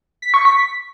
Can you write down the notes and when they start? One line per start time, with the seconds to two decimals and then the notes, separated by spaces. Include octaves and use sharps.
0.22 B6
0.34 C#6
0.45 B6